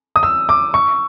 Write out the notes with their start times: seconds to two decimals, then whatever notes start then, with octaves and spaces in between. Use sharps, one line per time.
0.16 D#6
0.23 E6
0.49 D6
0.74 C#6